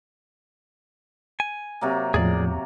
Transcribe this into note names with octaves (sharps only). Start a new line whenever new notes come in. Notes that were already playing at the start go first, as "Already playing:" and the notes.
G#5
C3 F#3 A#3
E2 A2 F3 G#4 D5